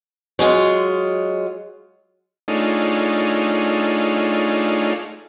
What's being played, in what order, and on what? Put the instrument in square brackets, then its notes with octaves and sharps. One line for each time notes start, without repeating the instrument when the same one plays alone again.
[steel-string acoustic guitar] F#3 G#3 F4
[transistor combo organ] A3 D4 D#4 F4 G#4 C#5